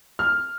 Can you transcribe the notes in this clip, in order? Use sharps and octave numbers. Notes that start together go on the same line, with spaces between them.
F6